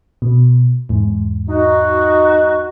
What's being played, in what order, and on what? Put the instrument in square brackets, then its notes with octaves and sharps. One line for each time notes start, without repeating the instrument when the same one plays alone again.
[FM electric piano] B2
E2 G#2
[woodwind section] D#4 F#4